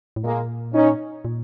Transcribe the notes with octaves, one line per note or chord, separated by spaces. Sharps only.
A2
A#2 G#3 A#3
C#4 D#4
A#2